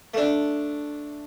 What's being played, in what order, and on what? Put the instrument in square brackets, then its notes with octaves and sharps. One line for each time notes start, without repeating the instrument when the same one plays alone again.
[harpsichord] A3 D4